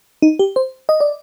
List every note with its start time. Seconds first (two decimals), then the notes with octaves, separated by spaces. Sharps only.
0.22 D#4
0.39 G4
0.56 C5
0.89 D#5
1.00 D5